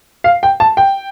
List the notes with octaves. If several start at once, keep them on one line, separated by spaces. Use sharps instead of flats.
F5
G5
A5
G5